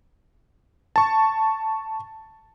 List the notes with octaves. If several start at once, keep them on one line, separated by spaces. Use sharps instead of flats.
A5 C#6